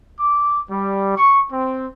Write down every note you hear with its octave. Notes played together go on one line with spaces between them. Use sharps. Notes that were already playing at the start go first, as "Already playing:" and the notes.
D6
G3
C#6
C4